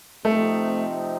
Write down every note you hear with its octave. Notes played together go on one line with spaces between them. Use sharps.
C3 F3 A3 C4 D#4